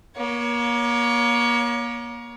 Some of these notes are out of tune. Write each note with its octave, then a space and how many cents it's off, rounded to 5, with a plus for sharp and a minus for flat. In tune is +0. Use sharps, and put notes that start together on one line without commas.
A#3 +35 C#5 +25